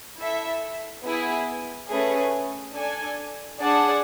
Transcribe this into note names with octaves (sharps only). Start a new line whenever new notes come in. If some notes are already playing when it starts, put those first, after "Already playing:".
E4 A4 E5
B3 E4 G#4
A3 C#4 G#4 B4
D4 A4 D5 G#5
D4 G#4 D5 F#5 A5